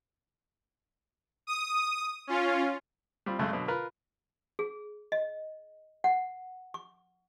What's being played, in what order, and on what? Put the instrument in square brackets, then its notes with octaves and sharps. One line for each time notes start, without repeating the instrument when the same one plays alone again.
[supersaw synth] D#6
C#4 F4
[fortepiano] G3 C4 F4
F#2 C#3 G#3 A3
B2 D3 F#3
F4 A#4 B4
[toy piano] G#4
D#5
F#5
C#6